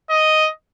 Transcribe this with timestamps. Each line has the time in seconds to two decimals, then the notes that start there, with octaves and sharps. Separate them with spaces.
0.10 D#5